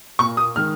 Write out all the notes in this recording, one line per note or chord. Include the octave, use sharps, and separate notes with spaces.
A#2 A#3 C#6
D#6
D#3 G#3 F6